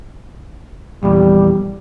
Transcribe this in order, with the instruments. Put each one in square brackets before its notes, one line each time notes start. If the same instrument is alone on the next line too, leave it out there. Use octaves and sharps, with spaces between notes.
[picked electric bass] A#1 E2 [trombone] G3